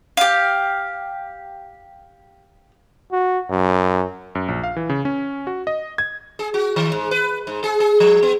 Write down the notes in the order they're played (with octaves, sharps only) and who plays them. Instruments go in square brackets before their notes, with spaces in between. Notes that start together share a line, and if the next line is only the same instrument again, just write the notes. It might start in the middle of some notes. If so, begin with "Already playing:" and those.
[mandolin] G4 F5
[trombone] F#4
F#2
[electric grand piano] F#2
A#1
F5
E3
C#3
C#4
F#4
D#5
G#6
[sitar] G#4
F#4
D#3
G#2
B4
G#2
G#4
G#4
F3
B3